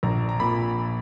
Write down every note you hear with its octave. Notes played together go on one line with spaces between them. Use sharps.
A#1 A#5
A#5
A#2 B5